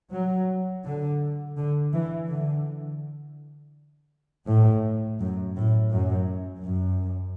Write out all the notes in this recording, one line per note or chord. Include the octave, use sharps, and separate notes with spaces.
F#3
D3
D3
E3
D3
A2
F#2
A2
F#2
F#2